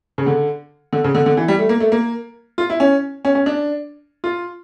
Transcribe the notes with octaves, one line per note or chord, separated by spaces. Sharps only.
C#3
D3
D3
C#3
D3
D3
E3
G3
A3
A#3
A3
A#3
F4
E4
C#4
C#4
C#4
D4
F4